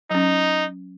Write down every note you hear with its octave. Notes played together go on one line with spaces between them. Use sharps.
F#3 C#4 D#4